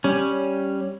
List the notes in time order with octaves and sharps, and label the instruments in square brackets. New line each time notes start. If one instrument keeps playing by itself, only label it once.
[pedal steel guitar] G3 C#4